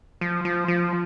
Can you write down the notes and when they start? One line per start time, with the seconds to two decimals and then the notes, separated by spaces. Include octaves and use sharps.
0.21 F3
0.45 F3
0.68 F3